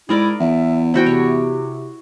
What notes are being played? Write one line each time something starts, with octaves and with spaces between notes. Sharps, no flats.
G#2 E4 G#4 A#4 D5
E2 E5
E4 F#4 C5 G5
C3 C#5